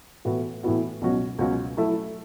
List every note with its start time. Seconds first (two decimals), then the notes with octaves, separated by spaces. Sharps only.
0.25 A2 E3 B3 F#4
0.63 A2 E3 B3 F#4
1.01 C#2 B2 F#3 C#4 F#4
1.39 C#2 B2 F#3 C#4 F#4
1.77 F#3 A3 E4 A4 E5